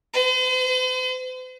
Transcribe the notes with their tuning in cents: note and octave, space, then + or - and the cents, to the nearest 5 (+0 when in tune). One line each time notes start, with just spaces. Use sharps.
C5 -45